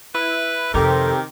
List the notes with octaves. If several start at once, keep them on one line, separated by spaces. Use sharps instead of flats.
E4 B4
F2 C3 D#3 C4 G4 A4 A#4